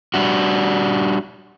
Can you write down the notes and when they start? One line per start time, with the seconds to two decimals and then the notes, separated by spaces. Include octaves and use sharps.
0.14 G3 D4 F#4